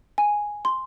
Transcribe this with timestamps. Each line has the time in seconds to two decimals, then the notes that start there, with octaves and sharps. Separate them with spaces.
0.18 G#5
0.65 C6